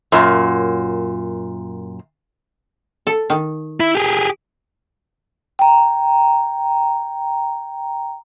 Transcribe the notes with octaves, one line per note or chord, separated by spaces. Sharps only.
F#2 A#2
A4
D#3
E4
G4 G#4
G5 A#5